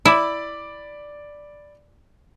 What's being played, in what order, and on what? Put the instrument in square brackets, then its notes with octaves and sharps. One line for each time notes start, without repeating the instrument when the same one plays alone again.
[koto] E4 [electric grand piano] D5 B5 D6